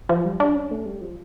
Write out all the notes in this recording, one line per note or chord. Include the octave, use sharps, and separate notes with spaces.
F3
G3
D4
C#4
A3
G3
F3